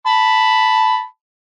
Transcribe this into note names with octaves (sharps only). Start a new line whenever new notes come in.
A5 B5